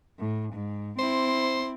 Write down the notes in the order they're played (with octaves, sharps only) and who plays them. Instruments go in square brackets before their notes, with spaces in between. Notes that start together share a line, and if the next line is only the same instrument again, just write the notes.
[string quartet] A2
G#2
[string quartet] C4 E4 [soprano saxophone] C5